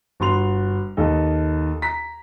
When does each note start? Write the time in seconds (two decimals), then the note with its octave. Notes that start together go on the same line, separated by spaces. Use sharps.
0.20 G1 F#4 C6 F7
0.97 D#2 A4 D#5
1.82 A#5 B6